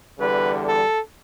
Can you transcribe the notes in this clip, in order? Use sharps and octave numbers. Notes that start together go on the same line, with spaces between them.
E2 D3 G3 B4
A4